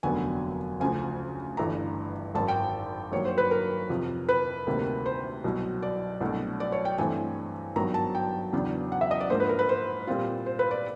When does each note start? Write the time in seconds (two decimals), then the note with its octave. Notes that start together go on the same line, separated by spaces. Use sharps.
0.03 F1 D#2 D3 F#3 B3 G#5
0.80 D2 C#3 F3 G#5
1.57 G1 G2 E3 A3 A#5
2.34 G#1 F#2 D#3 A5
2.48 G5
3.12 G2 D#3 F#3 A#3 C#5
3.25 C5
3.38 B4
3.51 A#4
3.90 F2 C3 F3
4.29 B4
4.67 D2 C3 D#3 G3 A#3
5.06 C5
5.44 C2 B2 F#3
5.83 D5
6.21 C2 B2 F#3 A3 D4
6.60 D5
6.72 C#5
6.85 G5
6.98 G2 E3 A3 C4 G#5
7.76 G#1 G2 D#3 F#3 B3 A#5
7.94 A5
8.15 G5
8.53 E2 C#3 F#3 B3 D4
8.92 F#5
9.01 E5
9.11 D#5
9.20 D5
9.30 G#2 F3 A#3 D4 C5
9.40 B4
9.49 A#4
9.59 B4
9.69 C5
10.07 A#2 G3 C4 F4
10.46 C5
10.59 B4
10.71 D5